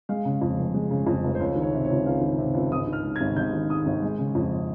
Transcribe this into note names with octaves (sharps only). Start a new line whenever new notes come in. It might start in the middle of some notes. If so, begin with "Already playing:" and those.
G#3 F5
C#3
F2
F1
G#3
C#3
F2
F1
C5
C#2 C#5
D#3
C#5
C3
C#5
C#2
C#2 F5
D#3
C3
C#2
G#1 D#6
D#3
F6
G#2
G#6
G#1
G#1 G6
D#3
G#2 D#6
G#1
G#3
C#3
F2